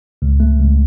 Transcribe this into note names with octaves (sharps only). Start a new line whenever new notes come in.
C#2
A3
C#2